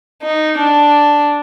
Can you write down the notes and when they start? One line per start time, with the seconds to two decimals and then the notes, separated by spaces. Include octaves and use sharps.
0.22 D#4
0.59 D4